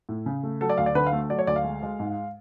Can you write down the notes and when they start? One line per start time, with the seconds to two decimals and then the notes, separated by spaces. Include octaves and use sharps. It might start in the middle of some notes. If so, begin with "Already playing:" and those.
0.09 A2
0.26 C#3
0.43 A3
0.61 F#3 A4
0.69 D5
0.78 D2 F5
0.86 D5
0.95 D3 B4
1.07 F5
1.13 A3
1.30 F#3 D5
1.39 C#5
1.47 D2 D5
1.56 F5
1.64 G#3
1.83 G#3
2.00 G#2